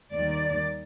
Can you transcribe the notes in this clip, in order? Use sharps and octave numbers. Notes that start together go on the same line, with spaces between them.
D#2 D#3 G3 D5